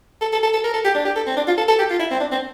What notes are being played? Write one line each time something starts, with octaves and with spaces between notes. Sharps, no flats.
A4
A4
A4
A4
A#4
A4
G4
D4
G4
A4
C4
D4
F4
A4
A4
G4
F4
E4
C4
D4
C4